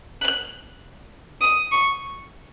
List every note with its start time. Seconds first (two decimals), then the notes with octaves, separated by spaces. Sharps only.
0.22 F#6
1.41 D#6
1.72 C#6